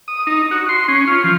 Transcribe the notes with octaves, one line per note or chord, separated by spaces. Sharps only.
D#6
D#4
F#4
C6
C#4
F4
F3